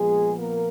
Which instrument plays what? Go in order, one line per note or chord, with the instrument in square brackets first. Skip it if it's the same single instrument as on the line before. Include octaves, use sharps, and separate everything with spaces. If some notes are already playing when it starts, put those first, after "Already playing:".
Already playing: [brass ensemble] A#2 F3 G#3 B3 G#4
A#3 A#4